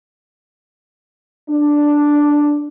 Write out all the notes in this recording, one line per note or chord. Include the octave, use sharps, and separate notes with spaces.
D4